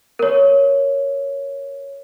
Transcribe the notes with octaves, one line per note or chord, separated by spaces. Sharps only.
A#4 C#5